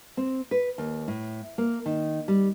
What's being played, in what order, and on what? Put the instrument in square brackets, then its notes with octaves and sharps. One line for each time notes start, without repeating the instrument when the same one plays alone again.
[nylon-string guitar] C4
B4
D#2
A2
A#3
D#3
G3